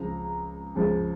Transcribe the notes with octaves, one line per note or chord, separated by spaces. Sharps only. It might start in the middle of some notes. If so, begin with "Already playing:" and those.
Already playing: C#2 C#3 F3 A#5
C#2 C#3 F3